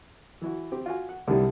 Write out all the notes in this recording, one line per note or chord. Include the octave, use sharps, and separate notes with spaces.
E3 E4 F#4
C4 G4
F4 F#4 G#5
F#5
C2 D3 D#3 G3